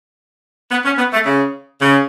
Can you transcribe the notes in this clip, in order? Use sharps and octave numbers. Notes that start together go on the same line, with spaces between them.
B3
C#4
B3
A3
C#3
C#3